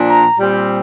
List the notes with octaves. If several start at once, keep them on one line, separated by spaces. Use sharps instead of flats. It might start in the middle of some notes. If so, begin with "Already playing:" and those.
Already playing: A#2 F3 D4
A#5
A#2 G3 C4